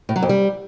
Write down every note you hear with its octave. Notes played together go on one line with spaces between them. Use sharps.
A2
F#3
F2
G3